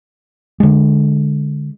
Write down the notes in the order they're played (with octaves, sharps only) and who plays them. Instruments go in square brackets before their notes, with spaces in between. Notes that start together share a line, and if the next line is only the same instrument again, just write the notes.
[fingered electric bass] D3 G#3